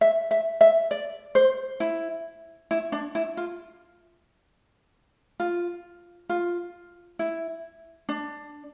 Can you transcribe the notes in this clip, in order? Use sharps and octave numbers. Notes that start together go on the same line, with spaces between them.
E5
E5
E5
D5
C5
E4
E4
D4
E4
F4
F4
F4
E4
D4